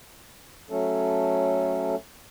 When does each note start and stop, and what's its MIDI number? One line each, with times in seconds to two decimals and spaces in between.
0.70 1.96 54
0.70 1.96 57
0.70 1.96 61
0.70 1.96 69